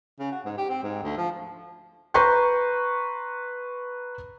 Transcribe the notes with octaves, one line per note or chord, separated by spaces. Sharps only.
C#3
F#4
G#2
G4
C4
G#2
D2
F3
B4 A#5 C6 C#6 G6